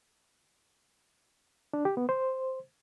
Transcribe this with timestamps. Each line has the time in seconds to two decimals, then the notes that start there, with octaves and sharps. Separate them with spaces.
1.73 D4
1.85 G4
1.97 B3
2.09 C5